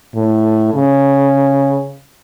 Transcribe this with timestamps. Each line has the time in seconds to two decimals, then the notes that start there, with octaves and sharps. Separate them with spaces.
0.15 A2
0.74 C#3